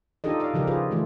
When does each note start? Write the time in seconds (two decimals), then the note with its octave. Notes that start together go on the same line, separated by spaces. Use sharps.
0.24 D4 D#4 F4 G4 A4 D#5
0.40 D5 F5
0.54 C#3 F3 G4 A#4
0.67 F4 G4 G#4 B4
0.91 E3 A3 F4